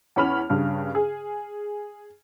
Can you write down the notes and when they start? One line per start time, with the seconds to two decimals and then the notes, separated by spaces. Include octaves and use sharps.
0.16 E2 C#4 B5 F6 F7
0.50 G2 C#3
0.95 G#4